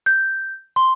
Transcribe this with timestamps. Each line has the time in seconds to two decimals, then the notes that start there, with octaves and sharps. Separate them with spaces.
0.06 G6
0.76 C6